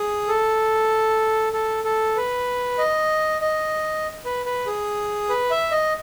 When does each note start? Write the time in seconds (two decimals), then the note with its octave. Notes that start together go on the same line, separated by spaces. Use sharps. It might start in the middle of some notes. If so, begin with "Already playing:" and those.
Already playing: G#4
0.28 A4
1.53 A4
1.84 A4
2.16 B4
2.78 D#5
3.41 D#5
4.25 B4
4.46 B4
4.67 G#4
5.29 B4
5.51 E5
5.71 D#5